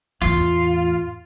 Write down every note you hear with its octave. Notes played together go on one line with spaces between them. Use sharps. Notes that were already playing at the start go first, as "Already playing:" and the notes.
E2 A2 F4